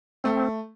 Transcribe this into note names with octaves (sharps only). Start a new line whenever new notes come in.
A3 C4